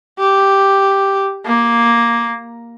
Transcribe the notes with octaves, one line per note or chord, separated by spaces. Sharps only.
G4
A#3